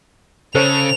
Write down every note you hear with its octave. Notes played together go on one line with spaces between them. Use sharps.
C#3 A4 C5 C#5 F7